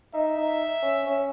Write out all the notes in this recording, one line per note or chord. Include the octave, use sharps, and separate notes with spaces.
D#4 E5
D#4
C#4
C#4